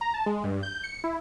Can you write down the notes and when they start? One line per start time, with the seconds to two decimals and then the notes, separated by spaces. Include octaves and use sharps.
0.01 A#5
0.14 A5
0.26 G#3
0.44 G2
0.63 G6
0.83 C#7
1.04 E4